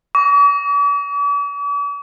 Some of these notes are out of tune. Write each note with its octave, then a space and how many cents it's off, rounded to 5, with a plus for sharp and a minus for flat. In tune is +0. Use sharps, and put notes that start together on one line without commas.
D6 -45